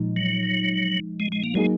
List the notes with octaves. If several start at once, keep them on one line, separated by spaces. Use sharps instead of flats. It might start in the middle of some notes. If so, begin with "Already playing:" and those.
Already playing: A#2 F3 G#3 D#4
F#3
G#3
G#3
A#3
F#3 G#3 A#3 D#4 G#4